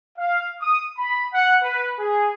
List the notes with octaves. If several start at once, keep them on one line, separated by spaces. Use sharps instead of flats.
F5
D#6
B5
F#5
B4
G#4